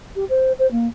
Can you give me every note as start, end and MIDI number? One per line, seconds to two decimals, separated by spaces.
0.16 0.24 67
0.29 0.52 72
0.59 0.69 72
0.71 0.87 58